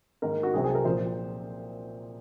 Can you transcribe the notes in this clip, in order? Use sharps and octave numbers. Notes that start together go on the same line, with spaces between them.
G#2 D#3 A#3 A#4
F#4
C2 C3 F#3 C4 G#4
G#4
A#4
A#2 F3 C4 C5